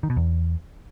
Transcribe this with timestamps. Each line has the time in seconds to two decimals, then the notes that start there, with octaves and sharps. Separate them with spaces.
0.03 D#3
0.10 B2
0.16 E2